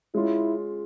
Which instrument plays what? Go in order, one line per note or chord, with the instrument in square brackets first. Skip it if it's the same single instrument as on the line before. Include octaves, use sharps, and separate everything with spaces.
[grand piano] G#3 C#4 F4 [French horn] E4